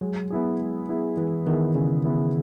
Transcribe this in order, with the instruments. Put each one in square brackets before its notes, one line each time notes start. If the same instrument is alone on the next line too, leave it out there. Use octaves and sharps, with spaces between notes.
[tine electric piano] F#3 [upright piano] G#3
[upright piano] B3 E4 G#4
G#3
B3 E4 G#4
[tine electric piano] E3 [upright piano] G#3
[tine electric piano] D#3 [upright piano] B3 E4 G#4
[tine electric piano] C#3 [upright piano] G#3
[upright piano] B3 E4 G#4